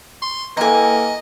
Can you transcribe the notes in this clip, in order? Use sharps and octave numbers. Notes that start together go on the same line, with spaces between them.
C6 C#6
E3 A#3 A4 D#5 G5 G#5 A#5 C6